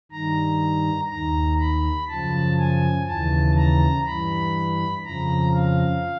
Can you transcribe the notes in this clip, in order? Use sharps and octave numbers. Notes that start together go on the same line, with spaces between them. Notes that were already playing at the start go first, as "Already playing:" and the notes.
G2 D#3 A#5
D#2 D#3 A#5
B5
F#2 C#3 F3 A5
G#5
D#2 C#3 E3 A5
A#5
G2 E3 B5
F2 C#3 F3 A#5
F5